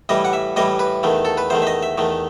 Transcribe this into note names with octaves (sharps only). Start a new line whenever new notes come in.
A2 E3 G3 D#5
F#5
E5
A2 E3 G3 D#5
B4
E2 D#3 A3
A4
B4
E2 D#3 A3 C5
E5
D#5
E5
E2 D#3 A3